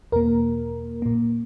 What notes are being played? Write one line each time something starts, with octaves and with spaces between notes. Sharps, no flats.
E2 B2 A#3 A#4
A#2 A#3